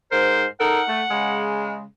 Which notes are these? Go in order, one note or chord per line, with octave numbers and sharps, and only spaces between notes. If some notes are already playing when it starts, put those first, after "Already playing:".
G#2 A#4 C5
D#4 A4 A#4 F#5
A3
C#3 G#3